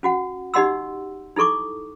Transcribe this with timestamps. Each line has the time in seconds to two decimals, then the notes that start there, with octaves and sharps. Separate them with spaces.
0.03 C#4 F#4 F#5
0.54 D#4 G4 D#5 F#5 C6 E6
1.36 D#4 E4 A4 C#6 D6